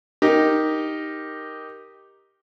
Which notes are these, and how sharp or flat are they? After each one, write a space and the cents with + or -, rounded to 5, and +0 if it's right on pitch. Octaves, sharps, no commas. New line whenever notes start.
D#4 +0 G4 +0 A#4 +0